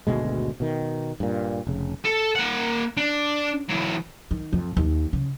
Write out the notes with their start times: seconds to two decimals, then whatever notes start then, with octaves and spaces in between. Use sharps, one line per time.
0.07 G#1 D2 B2 G#3
0.60 B2 D#3
1.20 G2 A#2
1.67 F1 C#3
2.05 A4
2.35 A#3 F#5
2.97 D4
3.69 E3 F#3
4.31 D#3
4.53 F2
4.77 D#2
5.13 C#3